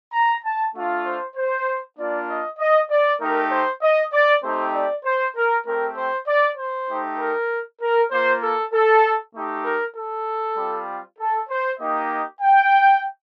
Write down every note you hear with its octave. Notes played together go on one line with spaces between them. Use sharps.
A#5
A5
A3 D4 F4
C5
C5
A#3 D4 F4 D5
D#5
D#5
D5
A3 D#4 G4 A#4
C5
D#5
D5
A3 C4 D#4 G4 C5
D5
C5
A#4
A3 C4 G4 A#4
C5
D5
C5
A3 D#4 G4
A#4
A#4
A#3 F4 C5
A4
A4
A3 D#4 G4
A#4
A4
G3 C4 F4
A4
C5
A#3 D#4 G4 D#5
G5